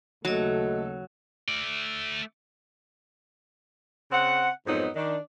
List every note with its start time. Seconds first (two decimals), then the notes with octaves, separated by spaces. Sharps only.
0.25 D#2 C#3 F#3 A3 F#4 A4 D#5
1.48 A3 D5
4.11 C#3 C4 F#5
4.67 F2 G#2 F#3 B3 D#4
4.95 D#3 D4